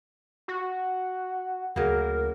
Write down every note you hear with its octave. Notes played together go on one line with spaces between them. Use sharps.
F#4
D2 C#3 F#3 A#3 A#4